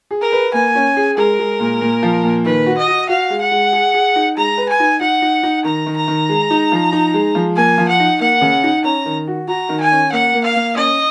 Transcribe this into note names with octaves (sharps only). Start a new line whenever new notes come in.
G#4
A#4
B4
A#3 G#5
C#4
G#4
G#3 A#4
G#3
A#2
A#2
F3
A#2
D#3 B4
F#4
D#5
F#4
F#4 F5
G#3
F#5
G#3
G#4
G#4
D#4
G#3 A#5
B4
G#5
D#4
D#4 F#5
D#4
D#4
D#3 A#5
D#3
A#5
D#3
G#3
D#4
F3
D#4
G#3
F3
A#3 G#5
F3
F#5
D#4
A#3 F#5
C#3
D#4
C#4 A#5
D#3
F#4
F#4 A#5
D#3
G#5
C#4
A#3 F#5
A#3
F5
A#3
C#4 D#5